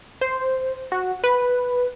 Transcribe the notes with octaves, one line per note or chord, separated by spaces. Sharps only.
C5
F#4
B4